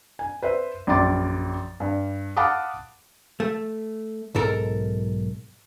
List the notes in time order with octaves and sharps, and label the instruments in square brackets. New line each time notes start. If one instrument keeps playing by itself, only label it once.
[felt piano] G#5
B4 C5 E5
A#1 F#2 C6 D6 A6
G2
F5 F#5 A5 B5 D6 D#6
[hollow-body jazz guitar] A3
B1 G#2 A4 A#4